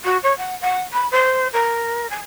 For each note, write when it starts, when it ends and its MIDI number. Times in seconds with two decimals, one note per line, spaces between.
0.04 0.17 66
0.23 0.35 73
0.37 0.54 78
0.61 0.80 78
0.92 1.06 83
1.11 1.47 72
1.52 2.09 70
2.10 2.19 80